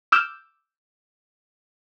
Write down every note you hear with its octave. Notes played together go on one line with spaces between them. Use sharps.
D6 E6 F6 G6 E7